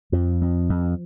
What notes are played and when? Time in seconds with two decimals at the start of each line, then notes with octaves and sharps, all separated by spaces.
0.12 F2 F3
0.41 F2
0.69 F2